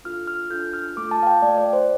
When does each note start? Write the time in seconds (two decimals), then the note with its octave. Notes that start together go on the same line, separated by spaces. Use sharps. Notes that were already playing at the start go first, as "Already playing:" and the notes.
0.04 D4 F4 A4 F6
0.27 F6
0.50 D4 F4 A4 G6
0.73 F6
0.96 A3 F4 A4 D6
1.11 A5
1.23 F5
1.27 G5
1.42 A3 F4 A4 D5
1.58 D5
1.73 C5